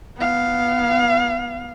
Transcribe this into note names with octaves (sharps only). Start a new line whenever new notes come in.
B3 F5